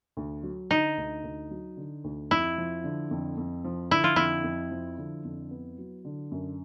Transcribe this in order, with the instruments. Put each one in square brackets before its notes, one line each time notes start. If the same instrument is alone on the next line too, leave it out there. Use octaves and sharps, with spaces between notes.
[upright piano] D2
F#3
[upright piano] D3 [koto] D#4
[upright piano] D2
D2
F#3
D3
D2
[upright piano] F2 [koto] E4
[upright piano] F3
D3
F2
F2
F3
[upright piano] D3 [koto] E4
[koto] F4
[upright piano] F2 [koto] E4
[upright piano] F2
F3
D3
F2
B3
F#3
D3
F#2